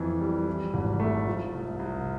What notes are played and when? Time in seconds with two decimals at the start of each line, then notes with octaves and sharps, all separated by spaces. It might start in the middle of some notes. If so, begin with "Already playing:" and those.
Already playing: F2 E3
0.21 G3
0.47 E3
0.74 G#1
1.00 A3
1.27 F3
1.53 C2
1.79 C2